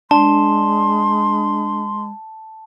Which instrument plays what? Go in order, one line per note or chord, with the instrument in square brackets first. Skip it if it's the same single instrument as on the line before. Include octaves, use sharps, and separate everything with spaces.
[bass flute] G#3 [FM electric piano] D4 [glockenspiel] A5 [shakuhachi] C6